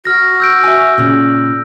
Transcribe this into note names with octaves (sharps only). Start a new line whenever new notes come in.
F#4 F6 A#6
E6 G6 D7
E5 G#5
A#2 C#3